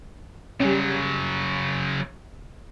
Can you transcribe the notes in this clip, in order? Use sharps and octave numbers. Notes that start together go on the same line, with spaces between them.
C#3 F#3 G3 C#4